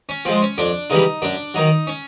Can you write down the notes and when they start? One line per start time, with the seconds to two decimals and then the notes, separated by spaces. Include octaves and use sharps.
0.09 C#4
0.25 F3 G#3 C4
0.42 C#4
0.58 F2 D4
0.90 C#3 E3 G3 D#4
1.22 F#2 D4
1.54 D#3 F#3 D#4
1.87 C#4